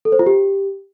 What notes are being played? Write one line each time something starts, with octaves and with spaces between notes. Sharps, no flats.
A4
C5
F4
G4